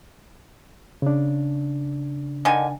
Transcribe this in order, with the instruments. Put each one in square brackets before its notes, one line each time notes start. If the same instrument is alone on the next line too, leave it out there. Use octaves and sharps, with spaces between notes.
[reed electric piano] C#3 D4
[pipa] D3 D#3 G#5